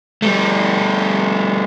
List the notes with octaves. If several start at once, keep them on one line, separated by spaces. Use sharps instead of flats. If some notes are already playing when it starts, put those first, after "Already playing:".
G3 A3